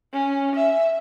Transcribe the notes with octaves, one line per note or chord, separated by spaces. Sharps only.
C#4
E5